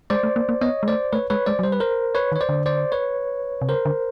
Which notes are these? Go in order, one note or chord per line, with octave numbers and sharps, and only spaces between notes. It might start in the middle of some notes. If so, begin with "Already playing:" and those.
G#3 C5 D5
A3
A#3
A#3
B3 C#5 D#5
G#3
A3 C5 D5
A3 B4 C#5
G#3 B4 C#5
G#3 C5 D5
F#3
G3 C5
B4
A#4 C5
B4 C#5
D#3
C#5
C5 D5
D3
C5 D5
B4 C#5
C3
C#3 A#4 C5
D3